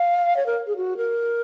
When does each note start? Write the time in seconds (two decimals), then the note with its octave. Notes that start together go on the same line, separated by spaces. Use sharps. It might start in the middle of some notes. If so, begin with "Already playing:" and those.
Already playing: F5
0.37 C#5
0.46 A#4
0.67 G#4
0.77 F#4
0.97 A#4